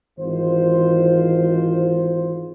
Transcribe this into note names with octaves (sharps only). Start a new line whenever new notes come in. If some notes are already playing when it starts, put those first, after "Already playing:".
G#1 E3 F4 C5